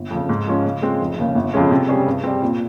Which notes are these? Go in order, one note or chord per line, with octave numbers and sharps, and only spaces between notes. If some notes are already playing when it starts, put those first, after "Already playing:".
Already playing: G1
F2 C#3
G#2
F3 G#3 C#4 F4
C#3
G#3 C4 F4
F1
D#2 C#3
G1
F2 C#3 G#3 C#4
C3
G3 C#4 G#4
G2
G3 C4
A#2